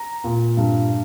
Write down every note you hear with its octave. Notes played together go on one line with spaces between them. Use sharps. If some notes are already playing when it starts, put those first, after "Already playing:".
Already playing: A#5
A#2
G2